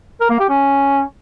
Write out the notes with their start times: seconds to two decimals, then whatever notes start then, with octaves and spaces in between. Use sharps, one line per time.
0.20 A#4
0.30 A#3
0.40 G4
0.49 C#4